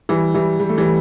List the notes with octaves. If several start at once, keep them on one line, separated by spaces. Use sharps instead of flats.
E3 G3
E3 G3
G3
A3
E3 G3